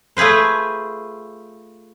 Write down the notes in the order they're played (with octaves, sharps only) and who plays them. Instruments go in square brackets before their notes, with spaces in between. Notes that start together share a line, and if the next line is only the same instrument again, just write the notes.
[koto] A3 F4 G#4 B4 C5